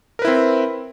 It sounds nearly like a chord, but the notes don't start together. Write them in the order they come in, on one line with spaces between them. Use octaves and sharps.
A#4 B4 E4 C4